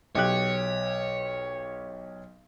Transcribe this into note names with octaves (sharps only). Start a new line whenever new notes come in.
B1 G4 C#5 F#6